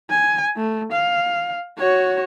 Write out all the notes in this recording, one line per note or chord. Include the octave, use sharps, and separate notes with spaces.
G#5
A3
F5
F#4 C#5